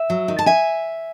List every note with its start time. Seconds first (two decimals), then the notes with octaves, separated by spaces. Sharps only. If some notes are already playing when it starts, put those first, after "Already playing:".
Already playing: E5
0.10 F#3
0.28 D#3
0.39 A5
0.46 E5 G#5